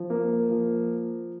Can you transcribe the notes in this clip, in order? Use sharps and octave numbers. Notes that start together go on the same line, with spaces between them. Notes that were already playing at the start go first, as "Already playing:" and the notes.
Already playing: F3
A#3
F3